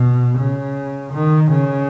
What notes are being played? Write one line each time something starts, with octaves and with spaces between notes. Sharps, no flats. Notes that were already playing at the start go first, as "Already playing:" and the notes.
Already playing: B2
C#3
D#3
C#3